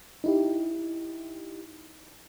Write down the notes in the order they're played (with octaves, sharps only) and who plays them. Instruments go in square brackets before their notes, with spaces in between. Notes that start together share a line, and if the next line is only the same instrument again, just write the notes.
[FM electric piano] D#4 E4 G4